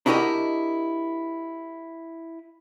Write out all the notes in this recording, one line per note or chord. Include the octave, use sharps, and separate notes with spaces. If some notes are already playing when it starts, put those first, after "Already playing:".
D4 E4 F#4 G4 A#4 D#5